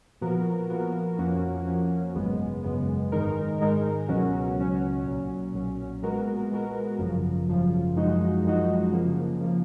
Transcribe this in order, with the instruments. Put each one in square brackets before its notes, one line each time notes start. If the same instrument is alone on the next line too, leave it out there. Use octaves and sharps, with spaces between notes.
[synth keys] A#2 F3 B3 F#4 A#4
A#2 F3 B3 F#4 A#4
F2 F3 A#3 C#4 F#4
F2 F3 A#3 C#4 F#4
G#1 F#2 C#3 G#3 B3
G#1 F#2 C#3 G#3 B3
G#2 D#3 G#3 D#4 A#4
G#2 D#3 G#3 D#4 A#4
C#2 B2 F#3 C#4 F#4
C#2 B2 F#3 C#4 F#4
B1 A#2 F#3 C#4
B1 A#2 F#3 C#4
A#2 G#3 B3 F#4 A#4
A#2 G#3 B3 F#4 A#4
G#1 F#2 C#3 F3
G#1 F#2 C#3 F3
F#2 F3 G#3 D#4 F#4
F#2 F3 G#3 D#4 F#4
C#3 F3 A#3
C#3 F3 A#3